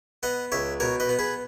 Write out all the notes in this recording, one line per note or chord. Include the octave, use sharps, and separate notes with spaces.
B3 D#5 F#5
C#2 C#5 E5
B2 A#4 C#5
B4 D#5
B3
G#4 B4